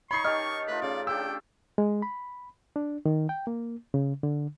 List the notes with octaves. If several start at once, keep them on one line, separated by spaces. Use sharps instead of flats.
D#4 C#5 B5 C#6 C7
D#3 G4 D#5 A5 F6
A3 F4 B4
C#3 D5
D4 G4 G5 E6
G#3
B5
D4
D#3
G5
A#3
C#3
D3